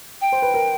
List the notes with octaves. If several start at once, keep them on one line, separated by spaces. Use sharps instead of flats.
G5
C5
B4
A#4